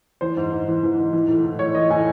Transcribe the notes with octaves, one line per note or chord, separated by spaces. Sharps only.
E3 C5
G#2
G#2
E3
E3
G#2
E3
A2
A2
E3 C#5
E3 D#5
A2 G#5